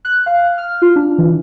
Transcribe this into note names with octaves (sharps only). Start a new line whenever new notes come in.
F#6
F5
F6
F4
D4
E3